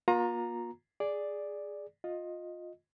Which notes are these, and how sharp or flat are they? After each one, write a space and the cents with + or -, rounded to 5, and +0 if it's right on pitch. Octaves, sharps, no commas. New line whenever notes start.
A#3 +40 F4 +35 A#5 +0
G#4 +0 D5 +0
F4 +20 D#5 +0